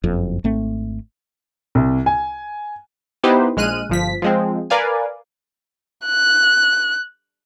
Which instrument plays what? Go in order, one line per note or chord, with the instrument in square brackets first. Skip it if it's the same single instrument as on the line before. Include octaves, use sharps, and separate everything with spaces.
[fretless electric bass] F#1 F2
G#1 A3 C4
[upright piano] C2
G#5
[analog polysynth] B3 D#4 E4 G4 B4 C5
A#1 G#3 F6 F#6 D#7
G1 F3 B6
F3 G#3 C4
A#4 B4 D5 F5 G#5
[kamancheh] F#6